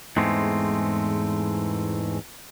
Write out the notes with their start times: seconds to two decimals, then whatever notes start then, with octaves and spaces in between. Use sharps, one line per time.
0.17 E2 G#2 G#3 A3 C4